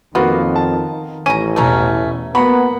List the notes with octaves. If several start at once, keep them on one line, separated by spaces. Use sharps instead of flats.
F2 D#3 A#3 B3 F4 F#4
A5
A1 C#4 A#5 D#7
E2 B2 A3 C#4 A#5
A#3 B3 F#4 F#5 A#5 B5